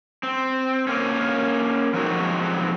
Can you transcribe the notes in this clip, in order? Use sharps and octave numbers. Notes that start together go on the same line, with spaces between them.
C4
A#3 C#4
F3 F#3 G#3 C4 D#4 F#4